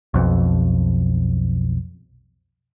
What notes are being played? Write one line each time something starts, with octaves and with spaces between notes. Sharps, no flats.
B1 F2